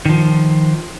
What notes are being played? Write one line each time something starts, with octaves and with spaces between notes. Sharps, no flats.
D#3 F3